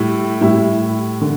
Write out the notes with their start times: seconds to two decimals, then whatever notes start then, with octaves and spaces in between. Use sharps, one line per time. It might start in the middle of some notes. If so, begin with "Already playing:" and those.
Already playing: A2 G3 E4
0.41 A2 G3 E4
1.21 D3